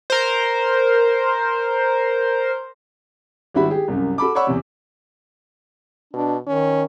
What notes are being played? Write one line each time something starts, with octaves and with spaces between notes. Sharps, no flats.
A#4 C5
G#1 G3 D4 E4 F#4 B5
G4 G#4
C2 F#2
F#4 A4 B5 D6
C#5 D5 F#5 B5 C#6 E6
E2 C3
B2 D4
D#3 C#4